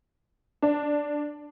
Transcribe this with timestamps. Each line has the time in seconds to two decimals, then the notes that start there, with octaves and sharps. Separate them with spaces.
0.62 D4